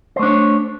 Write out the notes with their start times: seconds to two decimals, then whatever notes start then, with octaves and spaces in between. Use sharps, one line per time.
0.16 C5
0.19 A3
0.23 D4
0.26 C#5